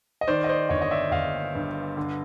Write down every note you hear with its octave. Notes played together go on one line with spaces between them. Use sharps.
D#5
D#3 C5 D5
D#5
C5 D5
G1 C#5 D#5
D#5
D5 E5
G1 D#5 F5
G2
D3